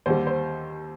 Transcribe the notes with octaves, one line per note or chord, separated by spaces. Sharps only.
D#2 D3 G3 C5
C5